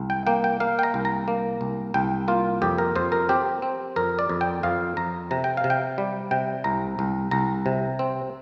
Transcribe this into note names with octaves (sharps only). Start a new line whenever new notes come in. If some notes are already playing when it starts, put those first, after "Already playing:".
Already playing: C2
G5
A#3 G5
G5
A#3 F5
G5
A#5
C2
A#5
A#3
C2
C2 G5
A#3 F4
F2 G4
A#4
F2 C5
A#4
C4 G4
C4
F2 A#4
D5
F2
G5
F2 F5
F2 A#5
C3 A#5
G5
F5
C3
G5
G3
C3 G5
C2 A#5
C2
C2 A#5
C3
C4